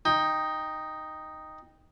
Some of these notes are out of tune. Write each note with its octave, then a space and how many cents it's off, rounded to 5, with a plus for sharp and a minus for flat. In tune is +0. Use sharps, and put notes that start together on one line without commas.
D#4 +0 G5 +10